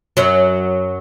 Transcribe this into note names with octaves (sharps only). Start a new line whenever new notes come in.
F#2 F#3